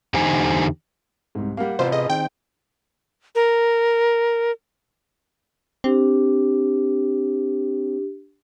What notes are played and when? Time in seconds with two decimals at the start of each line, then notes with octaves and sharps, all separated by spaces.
0.14 E2 D3 D#4 G4 C5 G#5
1.35 C2 G#2
1.57 G3 A#3 F5 F#5
1.79 A1 C3 F4 B4 C5
1.92 G#4 D#5
2.10 D#3 C4 G5
3.35 A#4
5.84 C4 D4 G4